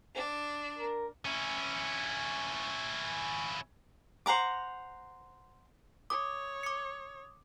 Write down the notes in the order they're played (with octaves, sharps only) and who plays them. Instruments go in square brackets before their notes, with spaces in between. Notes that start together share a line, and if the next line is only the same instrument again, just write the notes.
[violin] D4
[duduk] A#4
[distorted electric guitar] C#4 E4
[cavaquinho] C5 F#5 A#5 D6
[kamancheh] C#5 [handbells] D6 [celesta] D#6
[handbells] D6 C#7